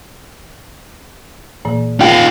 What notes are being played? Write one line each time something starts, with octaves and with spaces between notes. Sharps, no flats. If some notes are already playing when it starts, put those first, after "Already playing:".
A#2 E3 A#3
D#2 F4 G4 G#4 G5